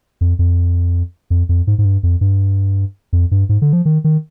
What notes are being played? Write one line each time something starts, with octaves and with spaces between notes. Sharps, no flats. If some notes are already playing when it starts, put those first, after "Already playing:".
F2
F2
F2
F2
G#2
G#2
G2
F2
G2
F2
G2
G#2
D3
F3
D#3
D#3